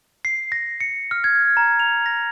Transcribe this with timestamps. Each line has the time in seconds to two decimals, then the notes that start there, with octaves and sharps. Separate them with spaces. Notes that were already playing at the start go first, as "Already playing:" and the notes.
0.25 C7
0.52 A#6
0.80 C#7
1.11 F6
1.24 G#6
1.57 A#5
1.80 F7
2.06 A#6